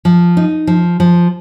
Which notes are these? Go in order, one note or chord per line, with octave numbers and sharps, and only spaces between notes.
F3
D#4
F3
F3